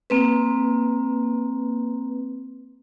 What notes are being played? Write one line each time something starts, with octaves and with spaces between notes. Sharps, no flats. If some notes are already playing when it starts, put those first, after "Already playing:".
A#3 C4 B4